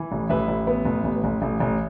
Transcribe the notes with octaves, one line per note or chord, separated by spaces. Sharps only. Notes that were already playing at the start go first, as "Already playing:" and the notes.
Already playing: E3
A1
A1 B4 E5
A1
B3
A1
A1
A1
A1
A1